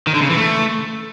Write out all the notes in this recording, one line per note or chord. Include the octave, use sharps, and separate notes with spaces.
D#3
D3
C#3
E3
A3